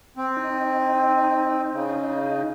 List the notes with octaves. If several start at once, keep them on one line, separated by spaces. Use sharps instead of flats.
C4
D#4
C#3